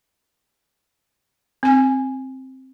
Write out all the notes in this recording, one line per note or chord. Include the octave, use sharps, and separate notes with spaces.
C4 G#5